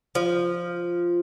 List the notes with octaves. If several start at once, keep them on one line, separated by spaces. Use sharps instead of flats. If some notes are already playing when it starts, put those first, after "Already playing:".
F3